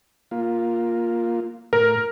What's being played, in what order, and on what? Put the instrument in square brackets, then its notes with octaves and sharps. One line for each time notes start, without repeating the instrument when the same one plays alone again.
[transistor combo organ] A#3 F4
[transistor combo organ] A2 [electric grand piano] A#4